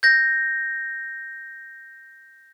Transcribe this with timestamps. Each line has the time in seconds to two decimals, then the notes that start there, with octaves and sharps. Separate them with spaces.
0.03 G6 A#6